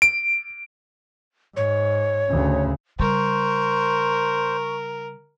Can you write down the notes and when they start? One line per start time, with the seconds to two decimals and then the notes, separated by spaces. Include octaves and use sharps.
0.02 D7
1.56 G#2 C#5
2.30 D2 C#3
2.99 C#3 G3 A#4 C5 C#6